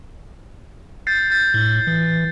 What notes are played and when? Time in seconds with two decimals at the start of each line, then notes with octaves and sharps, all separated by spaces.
1.07 G6 A6 C7
1.30 G6 A6
1.54 A2
1.87 E3